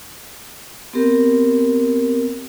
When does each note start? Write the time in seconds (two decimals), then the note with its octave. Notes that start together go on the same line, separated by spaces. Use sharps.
0.93 B3 C4 G4 A#4